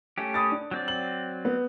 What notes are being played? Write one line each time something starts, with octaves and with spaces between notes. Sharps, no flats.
A3 C#4 G4
B5 D#6 A6
D4
F#3 C4 D5
F#7
B3